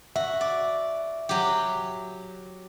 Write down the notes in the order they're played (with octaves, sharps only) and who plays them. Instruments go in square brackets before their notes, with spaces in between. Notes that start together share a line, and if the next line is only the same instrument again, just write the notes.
[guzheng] F#4 [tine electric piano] E5
[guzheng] D5
F#3 G4